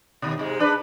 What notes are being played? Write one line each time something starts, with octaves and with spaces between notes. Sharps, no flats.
D#2 B2
G#2 C3 G#3
D4 B4